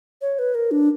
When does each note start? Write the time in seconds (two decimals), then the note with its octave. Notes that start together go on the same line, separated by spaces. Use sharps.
0.21 C#5
0.39 B4
0.55 A#4
0.71 D4